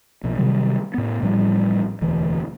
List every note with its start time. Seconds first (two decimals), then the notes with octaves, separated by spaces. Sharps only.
0.23 B1 A#2 F3
0.38 C3 D#3 F#3 G3
0.94 A2 B3
1.22 A1 A2 F3 G3
2.01 E1 D2 E3